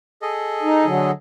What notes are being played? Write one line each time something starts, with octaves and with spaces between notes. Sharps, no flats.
G#4 A4 D#5
D#4
D3 F#3